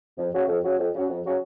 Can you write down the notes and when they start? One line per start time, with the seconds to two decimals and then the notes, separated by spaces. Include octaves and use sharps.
0.17 F2
0.33 C#3 F#3 C#4 F#4
0.47 F2
0.63 C#3 F#3 C#4 F#4
0.78 F2
0.93 C#3 F#3 C#4 F#4
1.08 F2
1.24 C#3 F#3 C#4 F#4